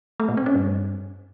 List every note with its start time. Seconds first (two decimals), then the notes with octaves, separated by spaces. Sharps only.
0.20 A3
0.28 A#2
0.37 C4
0.46 C#4
0.55 G2